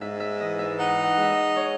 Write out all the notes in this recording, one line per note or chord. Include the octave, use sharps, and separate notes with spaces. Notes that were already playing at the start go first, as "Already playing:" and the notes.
G#2 E5
E5
E3 D#5
E5
D#4 F#5
F#5
G#3
E5
D#5
C#5